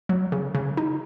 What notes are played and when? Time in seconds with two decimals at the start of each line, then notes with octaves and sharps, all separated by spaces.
0.09 F#3
0.32 C#3
0.55 C#3
0.77 D#4